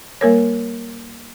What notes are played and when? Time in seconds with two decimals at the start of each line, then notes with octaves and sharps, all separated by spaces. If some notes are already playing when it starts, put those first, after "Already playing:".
0.21 G3 A#3 A#4 C#5